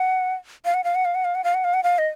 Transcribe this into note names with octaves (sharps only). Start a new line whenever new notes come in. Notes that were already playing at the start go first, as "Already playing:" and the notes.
Already playing: F#5
F5
F#5
F5
F#5
F5
F#5
F5
F#5
F5
F#5
F5
F#5
F5
D#5